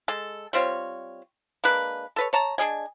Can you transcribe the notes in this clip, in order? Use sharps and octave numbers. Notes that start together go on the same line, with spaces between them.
G#3 A4
G3 C4 F4 C#5
G#3 A#3 D4 B4
A4 B4 C#5
C#5 A5 A#5
D4 G#4 D#5 G#5